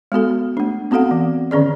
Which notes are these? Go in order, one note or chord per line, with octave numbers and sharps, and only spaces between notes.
G#3 B3 F#4 A4
A3 D4
B3 C4 F#4 A4 F5 F#5
E3
D3 D#3 C#4 G#4 D5